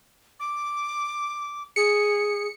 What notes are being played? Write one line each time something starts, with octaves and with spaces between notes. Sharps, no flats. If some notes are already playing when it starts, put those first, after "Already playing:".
D6
G#4 C#7